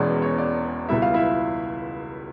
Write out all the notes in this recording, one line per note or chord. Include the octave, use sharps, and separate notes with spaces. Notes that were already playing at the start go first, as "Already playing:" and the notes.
Already playing: E1 E2 B2 G#3 C#4 D5
C#5
D5
C#2 B2 G3 E4 E5
F4 F5
E4 E5